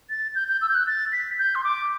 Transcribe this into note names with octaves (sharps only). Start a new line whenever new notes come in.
A6
G6
G6
E6
G6
F#6
A6
B6
G6
C6
D6